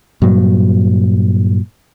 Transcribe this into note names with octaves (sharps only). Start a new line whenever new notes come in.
G2 A#2 F#3